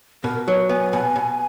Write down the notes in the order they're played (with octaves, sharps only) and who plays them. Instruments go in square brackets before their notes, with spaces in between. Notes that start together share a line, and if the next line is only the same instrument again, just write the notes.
[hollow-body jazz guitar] B2 [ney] A#4
[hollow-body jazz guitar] F#3 [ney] B4
[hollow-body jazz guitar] B3 [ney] G#5
[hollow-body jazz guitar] B2 [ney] G#5
[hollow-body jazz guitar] B2